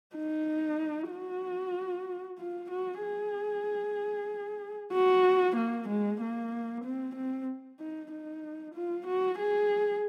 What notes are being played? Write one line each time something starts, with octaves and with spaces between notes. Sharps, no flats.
D#4
F#4
F4
F#4
G#4
F#4
A#3
G#3
A#3
C4
C4
D#4
D#4
F4
F#4
G#4